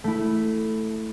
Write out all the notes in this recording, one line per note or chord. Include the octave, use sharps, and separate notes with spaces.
A3 E4